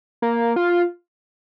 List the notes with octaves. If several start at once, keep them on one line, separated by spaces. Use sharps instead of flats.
A#3
F4